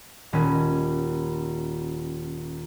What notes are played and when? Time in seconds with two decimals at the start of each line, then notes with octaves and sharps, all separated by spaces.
0.33 D#1 C#4 B5